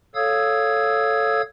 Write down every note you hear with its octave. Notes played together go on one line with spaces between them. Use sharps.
A4 C#5 F5 D#6 E6 G#6